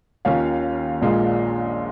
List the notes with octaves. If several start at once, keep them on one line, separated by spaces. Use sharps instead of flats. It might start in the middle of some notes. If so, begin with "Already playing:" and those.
D#2 D#3 C#4 F4 C#5 F5
A#1 A#2 G#3 F4